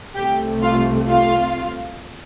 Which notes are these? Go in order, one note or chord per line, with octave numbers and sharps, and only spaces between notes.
C2 C3 A3 G4 G5
F4 F5
F4 F5